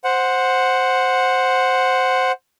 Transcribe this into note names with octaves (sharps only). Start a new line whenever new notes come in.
C5 F#5